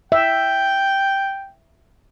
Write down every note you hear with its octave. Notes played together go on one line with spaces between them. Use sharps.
E5 G5